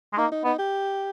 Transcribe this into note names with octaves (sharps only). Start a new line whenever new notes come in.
G#3
A#3 D#4
D#4
B3 D#4
G4